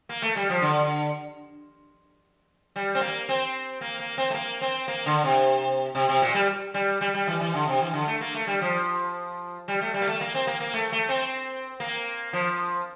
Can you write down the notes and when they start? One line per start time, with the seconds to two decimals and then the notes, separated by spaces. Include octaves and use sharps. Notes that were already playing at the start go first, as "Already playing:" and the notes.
0.09 A#3
0.22 A3
0.36 G3
0.49 F3
0.62 D3
2.76 G3
2.95 C4
3.01 A#3
3.29 C4
3.81 A#3
4.00 A#3
4.18 C4
4.30 A3
4.34 A#3
4.61 C4
4.88 A#3
5.06 D3
5.24 C3
5.95 C3
6.09 C3
6.22 A#2
6.34 G3
6.74 G3
7.01 G3
7.14 G3
7.27 E3
7.41 E3
7.55 D3
7.67 C3
7.81 E3
7.94 D3
8.07 A3
8.21 A#3
8.34 A3
8.47 G3
8.61 F3
9.68 G3
9.81 A3
9.94 G3
10.02 A#3
10.07 A3
10.21 A#3
10.35 C4
10.47 A#3
10.60 A#3
10.73 A3
10.92 A3
11.09 C4
11.80 A#3
12.33 F3